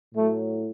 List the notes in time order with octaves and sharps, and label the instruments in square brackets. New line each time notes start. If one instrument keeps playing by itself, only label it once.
[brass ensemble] A2 F#3 A3